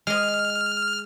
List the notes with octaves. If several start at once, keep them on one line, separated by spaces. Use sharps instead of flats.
G#3 D#5 F6